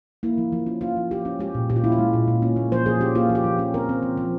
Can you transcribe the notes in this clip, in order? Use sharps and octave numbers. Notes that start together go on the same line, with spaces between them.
A#3 E4
F3
F3
C#4
A#3 F4
F3
F3 G4
C#4
G#3 G4
A#2
A#2 G4
F4
C#4 E4
F4
G#3
A#2
A#2
C#4
A#3
F3 C5
F3 G#4
C#4 G4
A#3 F4
F3
G4
F3
C#4
C4 A#4
C4
F3
F3